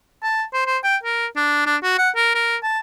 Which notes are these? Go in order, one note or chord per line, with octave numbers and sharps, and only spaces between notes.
A5
C5
C5
G5
A#4
D4
D4
F#4
F#5
A#4
A#4
A5